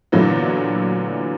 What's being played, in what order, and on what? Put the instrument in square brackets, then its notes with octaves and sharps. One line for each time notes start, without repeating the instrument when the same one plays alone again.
[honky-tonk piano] A#2 D3 E3 F#3 A3 B3